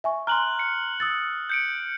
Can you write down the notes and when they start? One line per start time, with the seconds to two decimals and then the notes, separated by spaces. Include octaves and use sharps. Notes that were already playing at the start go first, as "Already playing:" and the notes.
0.04 E5 G#5 C#6
0.27 A#5 C6 F6 F#6 F#7
0.59 C#7
1.00 D#6 E6 A6
1.50 G6 C#7 D7